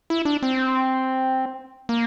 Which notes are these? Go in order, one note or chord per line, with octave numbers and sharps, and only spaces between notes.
E4
D4
C4
A#3